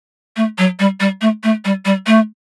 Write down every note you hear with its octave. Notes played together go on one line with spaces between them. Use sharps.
A3
F#3
G3
G3
A3
A3
G3
G3
A3